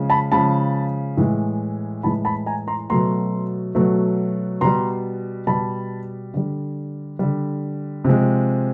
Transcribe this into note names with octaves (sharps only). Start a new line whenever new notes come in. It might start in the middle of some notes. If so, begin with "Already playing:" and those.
Already playing: C#3 F3 G#3
A5 B5
C#3 F3 G#3 A5 B5
A2 E3 G#3
A2 E3 G#3 A5 B5
A5 B5
G#5 A#5
A#5 C6
B2 F#3 A3 A#5 C6
B2 F#3 A3
B2 G3 A#5 C6
B2 G3 A5 B5
D3 G3
D3 G3
C3 F3 G#3